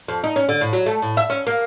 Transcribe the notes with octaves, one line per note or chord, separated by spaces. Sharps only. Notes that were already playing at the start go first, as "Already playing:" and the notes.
F2
D#4
C#4
D3
A2
F#3
A3
A2
E5
C#4
A#3